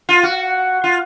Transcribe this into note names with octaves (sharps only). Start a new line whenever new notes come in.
F4
F#4
F4